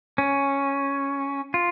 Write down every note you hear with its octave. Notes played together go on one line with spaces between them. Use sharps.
C#4
F4